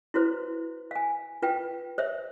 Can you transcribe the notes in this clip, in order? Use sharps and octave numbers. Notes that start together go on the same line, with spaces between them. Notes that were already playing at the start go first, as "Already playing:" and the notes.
E4 F#4 B4 C5
F5 G#5
F4 B4 F5 G5
C5 C#5 E5